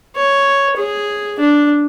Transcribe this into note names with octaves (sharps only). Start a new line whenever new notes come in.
C#5
G#4
D4